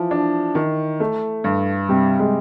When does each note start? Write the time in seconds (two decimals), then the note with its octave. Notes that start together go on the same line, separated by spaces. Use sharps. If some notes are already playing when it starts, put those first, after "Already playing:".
Already playing: E3 F3
0.11 D4
0.55 D#3
1.00 A3
1.44 G2
1.89 C3 G3
2.19 G#3